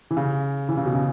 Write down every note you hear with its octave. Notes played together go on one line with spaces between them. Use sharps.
E3
C#3
E3
C#3
B2
C#3